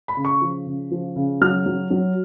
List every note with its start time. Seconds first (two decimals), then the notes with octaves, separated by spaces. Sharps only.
0.08 B5
0.17 C#3
0.25 C#6
0.41 F3
0.66 C#3
0.91 F3
1.16 C#3
1.41 F#3 F6
1.66 F#3
1.91 F#3